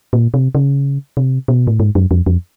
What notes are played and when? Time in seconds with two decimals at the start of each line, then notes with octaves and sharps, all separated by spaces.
0.13 A#2
0.34 C3
0.55 C#3
1.17 C3
1.48 B2
1.67 A2
1.80 G#2
1.95 F#2
2.11 F2
2.26 F2